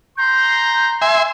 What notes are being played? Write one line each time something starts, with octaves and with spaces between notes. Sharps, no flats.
A#5 C6 G6
E5 G#5 C6